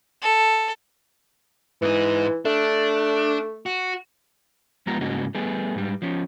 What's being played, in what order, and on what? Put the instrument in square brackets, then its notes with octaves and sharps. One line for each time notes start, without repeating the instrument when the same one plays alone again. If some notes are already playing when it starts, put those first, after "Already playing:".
[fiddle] A4
[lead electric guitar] G#2 D#4 [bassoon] E3
[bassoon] A3 [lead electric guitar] D4
[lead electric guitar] F#4
[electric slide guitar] F2 F3 G#3 B3 G4 A#5
G#2 C#3 A#3 C#4 F#4 D#5
G3 A3 B3 G#4
G#2 G3
F3 C#4